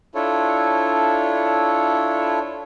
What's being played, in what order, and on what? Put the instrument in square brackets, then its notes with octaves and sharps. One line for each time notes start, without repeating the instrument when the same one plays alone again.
[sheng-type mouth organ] D4 E4 F4 A4 C#5